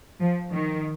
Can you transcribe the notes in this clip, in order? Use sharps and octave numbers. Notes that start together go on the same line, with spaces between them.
F3
D#3